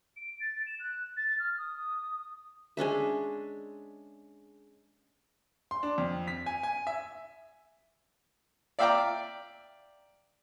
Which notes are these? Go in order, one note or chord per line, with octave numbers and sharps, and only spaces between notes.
D7
A6
E7
F#6
A6
F6
D#6
G#3 C#4 D4 E5
C6
D4
F2
B6
G#5
G#5
E5
D5 E5 F5 G5 A#5 D6